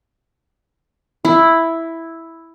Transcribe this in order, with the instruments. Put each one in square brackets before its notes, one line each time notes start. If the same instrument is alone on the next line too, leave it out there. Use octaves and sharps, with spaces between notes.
[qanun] E4